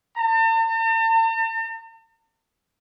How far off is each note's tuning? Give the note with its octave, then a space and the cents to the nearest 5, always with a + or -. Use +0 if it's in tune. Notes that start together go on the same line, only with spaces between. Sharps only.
A5 +45